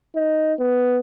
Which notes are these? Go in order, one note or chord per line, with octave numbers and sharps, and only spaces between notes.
D#4
B3